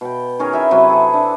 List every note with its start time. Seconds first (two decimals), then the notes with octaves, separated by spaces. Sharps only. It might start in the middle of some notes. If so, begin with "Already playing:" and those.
0.01 B2 G5
0.39 D#3 C#4 G#4 A#4
0.52 E4 G#4 E5 G5
0.71 C3 F#3 C4 B4
0.90 G#4 A4
1.14 D4